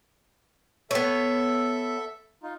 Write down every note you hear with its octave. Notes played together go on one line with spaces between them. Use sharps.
B3 A4 C#5 E5
D#4 F4